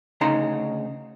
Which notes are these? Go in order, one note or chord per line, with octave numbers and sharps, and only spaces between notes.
D2 C#3 D#4 A#5 C6